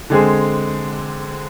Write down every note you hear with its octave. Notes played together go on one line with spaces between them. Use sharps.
D3 G#3 C4 G#4